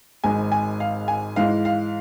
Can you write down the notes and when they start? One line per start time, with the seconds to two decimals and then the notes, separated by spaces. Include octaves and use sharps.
0.24 G#1 G#2 G#3 G#5
0.52 G#5
0.80 F5
1.08 G#5
1.36 G#2 E3 G#3 F5
1.65 F5